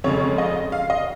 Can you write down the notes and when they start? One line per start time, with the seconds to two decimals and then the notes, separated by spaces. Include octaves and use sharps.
0.04 F2 C#3 G#3 C#5
0.38 D#5
0.72 F5
0.90 D#5